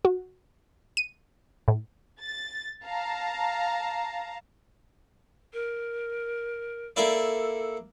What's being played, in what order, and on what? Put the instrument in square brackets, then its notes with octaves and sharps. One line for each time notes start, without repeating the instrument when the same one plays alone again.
[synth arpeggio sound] F#4
D#7
A2
[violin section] A6
F5 A5 A#5
[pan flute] A#4
[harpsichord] A#3 E4 D5 [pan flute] A4